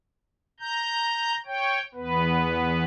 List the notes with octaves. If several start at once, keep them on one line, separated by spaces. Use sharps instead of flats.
A#5 G6
C#5 G5
E2 B3 B4